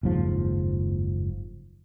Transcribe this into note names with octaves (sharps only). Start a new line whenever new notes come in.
F#1 D#2 G#2 F3